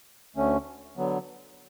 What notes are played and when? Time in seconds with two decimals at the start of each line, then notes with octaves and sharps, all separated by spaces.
0.36 D2 D3 A3 C#4
0.97 D3 F#3 B3